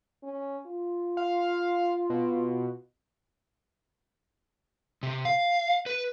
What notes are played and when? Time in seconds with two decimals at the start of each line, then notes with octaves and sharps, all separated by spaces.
0.24 C#4
0.67 F4
1.17 F5
2.10 B2
5.03 C3
5.25 F5
5.86 B4